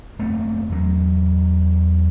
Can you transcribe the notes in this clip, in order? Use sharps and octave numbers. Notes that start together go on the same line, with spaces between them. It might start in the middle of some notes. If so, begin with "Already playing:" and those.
F#1 A3 A#3 C4
E2 F#3